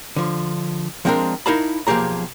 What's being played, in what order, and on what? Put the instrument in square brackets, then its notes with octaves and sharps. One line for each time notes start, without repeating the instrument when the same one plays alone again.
[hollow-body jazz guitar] D3 F3
F3 G#3 C4 D4 A#4
D#4 E4 A#4 F5 A5 B5
B1 F3 A#3 G4 G#4 A#5